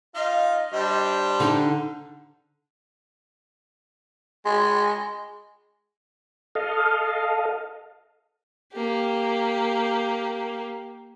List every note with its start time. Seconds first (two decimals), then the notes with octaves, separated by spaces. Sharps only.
0.15 D#4 F4 D#5 F5
0.73 G3 D4 C5
1.40 D3 D#4
4.46 G#3
6.55 A4 D#5 F5
8.73 A#3 G4